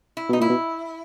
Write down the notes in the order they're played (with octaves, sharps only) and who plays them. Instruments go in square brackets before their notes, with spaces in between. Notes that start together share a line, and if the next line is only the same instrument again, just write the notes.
[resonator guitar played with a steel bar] E4
[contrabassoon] B2 [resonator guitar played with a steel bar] D#4
[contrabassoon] A#2 [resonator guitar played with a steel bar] E4
[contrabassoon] B2